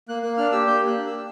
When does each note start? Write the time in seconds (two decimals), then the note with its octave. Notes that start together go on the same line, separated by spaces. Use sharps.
0.09 A#3 F#6
0.23 A#3 F#6
0.37 D4 F6
0.52 G4 E6
0.67 A#3 G6
0.82 A#3 F#6
0.97 D4
1.07 G4 E6